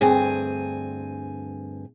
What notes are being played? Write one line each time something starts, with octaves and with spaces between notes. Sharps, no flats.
D2 G2 C4 G#4 G#5